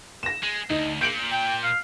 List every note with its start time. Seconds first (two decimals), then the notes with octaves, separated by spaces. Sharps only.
0.23 A#6 E7
0.43 G#3
0.70 D2 D#4
1.01 A#2 G6 D7 F#7
1.31 G5
1.63 F5